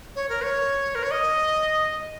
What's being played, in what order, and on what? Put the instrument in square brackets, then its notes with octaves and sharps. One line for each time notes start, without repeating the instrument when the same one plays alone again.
[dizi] C#5
A#4
C#5
A#4
C#5
D#5